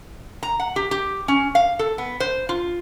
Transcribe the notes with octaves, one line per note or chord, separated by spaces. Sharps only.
A#5
F#5
G4
G4
C#4
F5
A4
B3
C5
F4